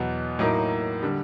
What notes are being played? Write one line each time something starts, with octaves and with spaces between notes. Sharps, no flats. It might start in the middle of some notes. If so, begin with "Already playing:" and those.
Already playing: E2 B2 F#3 B3
A2 F#3 A#3 D#4
D3 G3